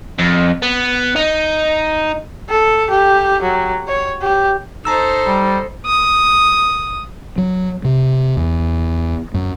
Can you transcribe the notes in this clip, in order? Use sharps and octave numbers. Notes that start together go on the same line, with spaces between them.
F2
B3
D#4
A4
G4
F#3
C#5
G4
D#4 A4 C5 A5 A#5 E6
G3
D#6
F#3
C3
E2
F#2